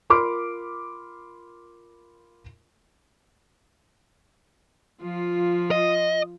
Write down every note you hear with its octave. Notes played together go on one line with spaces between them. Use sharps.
F4 A#4 B5 C6 D6 F6
F3 F4
D#5